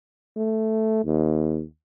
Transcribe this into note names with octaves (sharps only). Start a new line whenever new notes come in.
A3
D#2